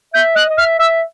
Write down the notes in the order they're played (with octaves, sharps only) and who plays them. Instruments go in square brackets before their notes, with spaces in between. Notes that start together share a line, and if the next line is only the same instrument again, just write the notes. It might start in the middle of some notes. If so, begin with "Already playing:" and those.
[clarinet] E5 [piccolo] G6
[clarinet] D#5 [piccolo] F#6
[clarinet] D#5
[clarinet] E5 [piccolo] F6
[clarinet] E5 [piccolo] E6